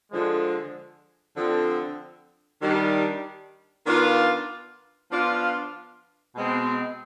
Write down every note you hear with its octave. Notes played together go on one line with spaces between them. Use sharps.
D3 F3 G#3
D3 F3 C4
D#3 G3 D4
D#3 B3 D4 F4
F3 B3 D4 F4
B2 G#3 C4